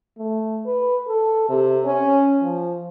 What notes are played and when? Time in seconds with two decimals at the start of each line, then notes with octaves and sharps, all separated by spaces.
0.17 A3
0.66 B4
1.08 A4
1.49 C3
1.84 C#4
2.42 F3